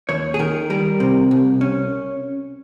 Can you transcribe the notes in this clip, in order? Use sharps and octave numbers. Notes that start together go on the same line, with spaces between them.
D#2 C#5
G#4
D#3 A#4
G3 A#4
C3
C2
C#4